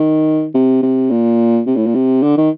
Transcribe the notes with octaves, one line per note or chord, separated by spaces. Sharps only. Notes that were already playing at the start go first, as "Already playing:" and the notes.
Already playing: D#3
C3
C3
A#2
C3
A2
A#2
C3
D3
D#3